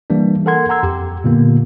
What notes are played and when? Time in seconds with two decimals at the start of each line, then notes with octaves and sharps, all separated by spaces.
0.10 E3 G3 A#3 D4
0.46 A4 A#4 F#5 C6 G#6
0.69 F#5 A#5 C6 E6 G#6
0.83 F2 G4
1.24 A#2 D3 A#3 B3